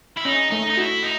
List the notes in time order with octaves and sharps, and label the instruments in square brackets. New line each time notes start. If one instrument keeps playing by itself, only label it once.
[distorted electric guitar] E4
[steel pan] C#4 [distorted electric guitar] D#4
[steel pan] A3 [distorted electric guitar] D#4
[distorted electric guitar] D#4
[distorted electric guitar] E4 [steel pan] F#4
[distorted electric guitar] D#4